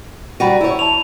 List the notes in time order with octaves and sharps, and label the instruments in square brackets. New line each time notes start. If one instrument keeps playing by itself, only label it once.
[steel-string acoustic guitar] G3 F#4 [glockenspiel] A#5 B5 D#7
[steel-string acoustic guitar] E4 C#5
[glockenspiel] A5 B5 F7